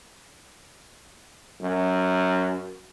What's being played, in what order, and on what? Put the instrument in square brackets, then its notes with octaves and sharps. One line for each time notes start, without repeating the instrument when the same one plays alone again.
[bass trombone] F#2